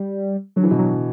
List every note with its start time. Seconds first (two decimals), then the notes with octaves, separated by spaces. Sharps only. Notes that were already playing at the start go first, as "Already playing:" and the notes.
Already playing: G3
0.56 D3 F#3
0.63 E3
0.71 B2 D3
0.79 F#3